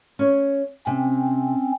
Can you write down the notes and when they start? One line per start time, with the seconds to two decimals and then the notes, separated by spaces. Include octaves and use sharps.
0.19 C#4 C#5
0.87 C3 C4 C#4